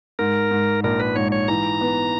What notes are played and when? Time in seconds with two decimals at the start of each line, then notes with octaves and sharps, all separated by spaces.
0.19 G#2 A#4
0.51 G#2
0.84 A#1 A#4
1.00 B4
1.16 G#2 C#5
1.32 C#5
1.48 E3 A#5
1.81 B3